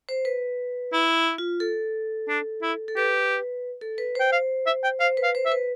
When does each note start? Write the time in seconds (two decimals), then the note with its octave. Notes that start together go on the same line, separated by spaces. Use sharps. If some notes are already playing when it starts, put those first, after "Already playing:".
0.09 C5
0.25 B4
0.93 E4
1.38 F4
1.60 A4
2.29 D4
2.62 E4
2.88 A4
2.96 G4 B4
3.81 A4
3.98 B4
4.15 C5 G5
4.32 F5
4.67 E5
4.84 G5
5.00 C5 F5
5.17 B4
5.23 F5
5.35 C5
5.45 E5
5.52 B4